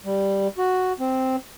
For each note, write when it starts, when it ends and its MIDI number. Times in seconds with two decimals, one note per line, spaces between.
0.05 0.48 55
0.58 0.93 66
1.00 1.36 60